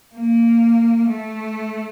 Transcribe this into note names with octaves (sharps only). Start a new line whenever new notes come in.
A#3
A3